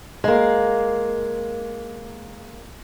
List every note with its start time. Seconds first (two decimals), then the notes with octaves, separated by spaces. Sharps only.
0.24 G#3 A#3